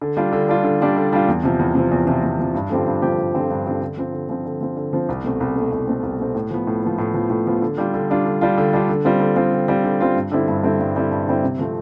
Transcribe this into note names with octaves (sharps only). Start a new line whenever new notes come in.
D3
G3 D4 F4
D3
G3 D4 F4
D3
G3 D4 F4
D3
G3 D4 F4
E2
C3 F3
E2
C3 F3
E2
C3 F3
E2
C3 F3
G2
D3 F3 C4 G4
G2
D3 F3 C4 G4
G2
D3 F3 C4 G4
G2
D3 F3 C4 G4
D3
F3 C4
D3
F3 C4
D3
F3 C4
D3
F3 C4
C2
B2 A3 C4
C2
B2 A3 C4
C2
B2 A3 C4
C2
B2 A3 C4
A2
F3 B3
A2
F3 B3
A2
F3 B3
A2
F3 B3
D3
G3 D4 F4
D3
G3 D4 F4
D3
G3 D4 F4
D3
G3 D4 F4
D3
G3 C4 F4
D3
G3 C4 F4
D3
G3 C4 F4
D3
G3 C4 F4
G2
D3 G3 C4 E4
G2
D3 G3 C4 E4
G2
D3 G3 C4 E4
G2
D3 G3 C4 E4
C3
F3 A3 C4